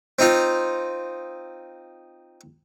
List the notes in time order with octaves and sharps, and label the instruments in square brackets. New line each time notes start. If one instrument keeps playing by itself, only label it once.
[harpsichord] C4 D#4 F4